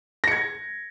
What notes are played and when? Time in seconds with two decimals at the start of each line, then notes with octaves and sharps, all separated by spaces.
0.24 A#6
0.28 C#7
0.31 G#6